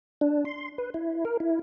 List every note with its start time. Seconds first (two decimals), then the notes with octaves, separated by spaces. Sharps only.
0.21 D4
0.45 C6
0.78 B4
0.94 E4
1.25 A#4
1.40 E4